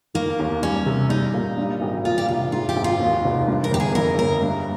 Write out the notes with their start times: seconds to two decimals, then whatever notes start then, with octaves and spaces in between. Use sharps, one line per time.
0.15 D#3 A#3
0.39 D#2
0.62 G3 C#4
0.86 C3
1.09 G3 D#4
1.34 A#2
1.58 G2
1.81 G#1
2.05 A#2 F4
2.18 G4
2.28 C2 F4
2.52 G#2 F4
2.69 G4
2.76 G#1
2.84 F4
3.00 D#2
3.24 F1
3.48 G2
3.64 A#4
3.71 G1 G4
3.80 G#4
3.95 F2 A#4
4.18 G1 A#4
4.42 G2